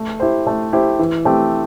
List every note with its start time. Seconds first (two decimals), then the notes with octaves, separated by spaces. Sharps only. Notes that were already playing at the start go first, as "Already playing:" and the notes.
Already playing: A3
0.20 E4 G4 C5
0.47 A3
0.73 E4 G4 C5
0.99 E3
1.25 A3 C4 G4